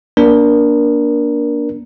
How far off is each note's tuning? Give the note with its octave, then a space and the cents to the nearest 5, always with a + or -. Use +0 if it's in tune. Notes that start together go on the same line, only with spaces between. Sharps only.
A#3 +30 D4 -10 A#4 +20